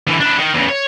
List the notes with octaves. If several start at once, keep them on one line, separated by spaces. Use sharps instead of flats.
D3 E3
D4 E4
D#3
E2 C#3
C#5